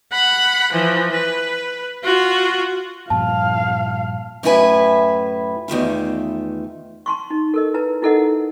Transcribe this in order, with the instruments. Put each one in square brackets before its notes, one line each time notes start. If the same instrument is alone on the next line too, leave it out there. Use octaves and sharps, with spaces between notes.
[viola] F#5 B5
E3 F3
B4
F4 F#4
[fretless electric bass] G2 A#2 F3 [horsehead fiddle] F5 [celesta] A5
[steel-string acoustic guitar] F#2 A2 A3 E4 B4 G#5
E2 D#3 A3 F4
[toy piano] A5 C6 C#6
D#4
A4 A#4 D#5
E4 B4 A5
D#4 E4 A4 A#4 D#5 F#5
A4